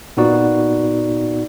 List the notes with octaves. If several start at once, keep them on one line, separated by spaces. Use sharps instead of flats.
A#2 B3 D#4 F#4 D5